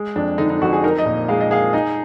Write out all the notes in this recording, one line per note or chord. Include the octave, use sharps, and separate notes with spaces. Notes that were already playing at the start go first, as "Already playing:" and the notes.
Already playing: G#3
F2 D4
D3 D#4
D#4
F2 F#4
G#4
D#4 A#4
D#5
A#2
G#3 F5
D#5
G#4 F5
D#4 D#5